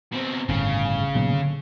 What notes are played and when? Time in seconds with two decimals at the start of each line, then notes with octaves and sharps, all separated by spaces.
0.12 B2 C4
0.48 G1 A2 C#3
1.15 A#2 F#3 B3
1.33 D3